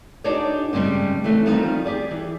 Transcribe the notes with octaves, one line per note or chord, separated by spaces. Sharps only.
D4 D#4 F#4 G#4 C#5 D5
G2 C#3 G3 G#3 C4
E3 A3 C4 C#4
D#3 F3 G3 B3 C4 D#4
G4 G#4 D5
E3